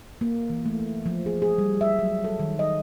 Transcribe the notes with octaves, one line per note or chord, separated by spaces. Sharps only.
A#3
E3
A3
F3
G#4
G#4
G3
E5
F#3
A4
D#3
D#5